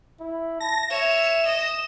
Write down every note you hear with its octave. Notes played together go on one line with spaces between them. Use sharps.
E4
A5 A#6
C#5 E5 E7
D#5